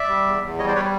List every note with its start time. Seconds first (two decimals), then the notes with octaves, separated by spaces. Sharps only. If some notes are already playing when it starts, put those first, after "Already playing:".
Already playing: D5 E5
0.08 G3
0.26 E2
0.43 E2
0.59 G3 C#5 D#5
0.67 C5 D5
0.75 G3 B4 C#5